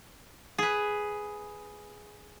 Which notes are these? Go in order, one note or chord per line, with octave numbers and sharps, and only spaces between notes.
G#4 B4